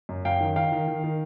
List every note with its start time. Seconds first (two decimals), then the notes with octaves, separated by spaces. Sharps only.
0.09 F#2
0.25 F#2 F5 G5
0.41 D#3
0.56 D#3 F5 G5
0.72 D#3
0.88 D#3
1.04 D#3